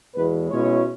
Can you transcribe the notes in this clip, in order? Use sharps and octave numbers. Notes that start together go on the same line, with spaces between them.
E2 B2 G#3 E4 B4
B2 G#3 C#4 E4 C#5